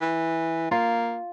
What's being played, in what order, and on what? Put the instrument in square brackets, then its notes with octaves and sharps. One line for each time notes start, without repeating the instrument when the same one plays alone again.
[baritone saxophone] E3
[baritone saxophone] A#3 [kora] F4